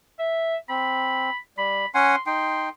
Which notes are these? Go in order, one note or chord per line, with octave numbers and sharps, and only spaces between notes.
E5
C4 B5
G3 B5
C#4 F#5 G#5 C6
D#4 G5 C6